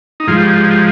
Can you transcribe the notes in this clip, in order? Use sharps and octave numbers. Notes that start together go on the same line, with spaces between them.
D#4
G#2 F3 F4
G4
G4
G4